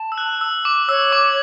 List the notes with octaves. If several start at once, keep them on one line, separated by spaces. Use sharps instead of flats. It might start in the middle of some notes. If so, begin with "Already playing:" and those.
Already playing: A5
E6
F#6
E6
D6
C#5 E6
D6